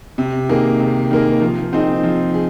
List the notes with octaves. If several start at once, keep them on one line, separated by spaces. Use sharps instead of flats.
C3
D#3 A#3 G#4
C3
D#3 A#3 G#4
F3
C4 D#4 G#4
F3
G#4